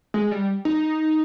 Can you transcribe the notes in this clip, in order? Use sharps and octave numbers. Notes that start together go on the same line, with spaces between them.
G#3
G3
D#4